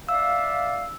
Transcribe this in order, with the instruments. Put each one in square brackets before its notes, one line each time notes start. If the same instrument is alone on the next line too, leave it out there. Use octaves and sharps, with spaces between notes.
[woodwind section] D5 E5 F5 [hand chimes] E6